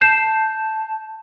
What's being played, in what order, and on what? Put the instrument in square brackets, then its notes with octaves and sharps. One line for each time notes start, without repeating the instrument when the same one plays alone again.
[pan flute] A5 [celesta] G6 C7 E7